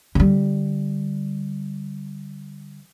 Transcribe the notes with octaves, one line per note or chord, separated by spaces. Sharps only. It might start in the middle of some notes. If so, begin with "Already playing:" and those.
D3 G3